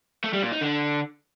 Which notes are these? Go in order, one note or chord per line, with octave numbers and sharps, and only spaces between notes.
A3
G3
A#2
D#4
D3